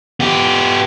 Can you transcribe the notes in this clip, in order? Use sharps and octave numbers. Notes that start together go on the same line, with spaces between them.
B3 G4